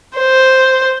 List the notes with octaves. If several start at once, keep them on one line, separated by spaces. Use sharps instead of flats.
C5